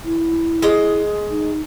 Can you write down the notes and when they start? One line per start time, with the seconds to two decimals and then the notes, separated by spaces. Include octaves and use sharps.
0.05 E4
0.62 G#3 D#5
1.30 D#4